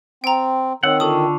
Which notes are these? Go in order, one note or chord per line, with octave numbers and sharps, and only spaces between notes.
C4 G5 A#5
D#3 C4 C#5 F#5 E6
D3 F4 A4 A5 C#6 D#6